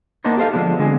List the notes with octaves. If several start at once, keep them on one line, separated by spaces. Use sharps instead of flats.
A#3 B3 D4 D#4 C5
G4 A4 C5 F5
D3 F3 G#3 B3 D4
D3 G#3 C4 G#4